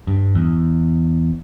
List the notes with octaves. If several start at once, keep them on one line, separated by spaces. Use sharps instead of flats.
G2
E2